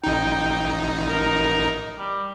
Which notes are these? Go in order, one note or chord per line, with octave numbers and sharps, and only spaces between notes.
A1 D#4 G5
A#4
G3